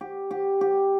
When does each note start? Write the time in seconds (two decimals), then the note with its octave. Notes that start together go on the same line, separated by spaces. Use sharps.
0.01 G4
0.31 G4
0.61 G4